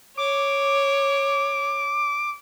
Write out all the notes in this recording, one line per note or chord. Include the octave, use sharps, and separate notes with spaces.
C#5 D6